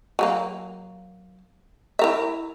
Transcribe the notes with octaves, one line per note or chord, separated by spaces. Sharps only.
F#3 A3 A#3
E4 A#4 E5